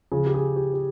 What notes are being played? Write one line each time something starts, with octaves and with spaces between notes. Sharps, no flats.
C#3 F3 G#4
G4
G#4
G4
G4